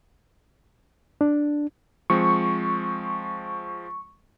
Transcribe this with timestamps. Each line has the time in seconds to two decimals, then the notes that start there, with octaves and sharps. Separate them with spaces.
1.21 D4
2.10 F3 G#3 C4 C#6